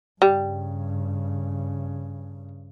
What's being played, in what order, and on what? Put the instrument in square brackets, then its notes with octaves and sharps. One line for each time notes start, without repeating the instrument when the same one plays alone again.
[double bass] G2 C#3 [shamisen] G3